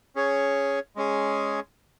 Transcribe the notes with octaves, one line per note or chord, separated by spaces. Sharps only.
C#4 G#4 C#5
G#3 C#4 G#4